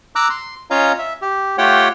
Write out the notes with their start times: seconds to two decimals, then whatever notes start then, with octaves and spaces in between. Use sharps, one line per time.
0.16 A#5 D6 E6 F#6
0.30 C6
0.70 C#4 F4 C#5 D#5 F5 A#5
0.99 E5
1.22 G4
1.58 A3 F4 G4 C#5 F#5 G5